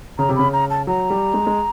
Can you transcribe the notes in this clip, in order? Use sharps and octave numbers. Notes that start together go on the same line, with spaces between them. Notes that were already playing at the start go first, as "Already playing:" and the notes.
C#3 A#5
C3
C#3 B5
A#5
A5
F#3 A#5
G3
G#3
G#3